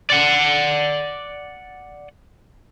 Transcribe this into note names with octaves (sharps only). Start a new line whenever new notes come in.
D5 F#5